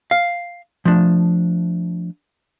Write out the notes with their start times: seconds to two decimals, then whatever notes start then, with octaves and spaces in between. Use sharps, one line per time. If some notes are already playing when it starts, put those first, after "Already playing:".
0.11 F5
0.85 F3 A3 D4